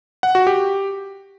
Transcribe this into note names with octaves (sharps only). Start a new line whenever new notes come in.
F#5
F#4
G4